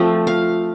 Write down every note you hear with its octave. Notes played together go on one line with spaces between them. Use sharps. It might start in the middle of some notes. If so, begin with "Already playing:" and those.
Already playing: F3 A3 C4
F5